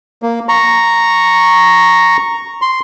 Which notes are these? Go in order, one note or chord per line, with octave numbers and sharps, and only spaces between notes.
A#3
A#5 C#6
C6